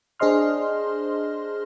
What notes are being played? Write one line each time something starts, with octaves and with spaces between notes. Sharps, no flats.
D4 G#4 C5 D#5 C6 F6